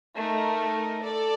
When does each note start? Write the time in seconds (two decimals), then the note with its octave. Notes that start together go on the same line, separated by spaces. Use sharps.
0.16 A3 D#4 A#4
1.04 A4 D5